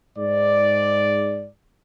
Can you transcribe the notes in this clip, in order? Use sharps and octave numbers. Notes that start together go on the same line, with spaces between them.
G#2 D5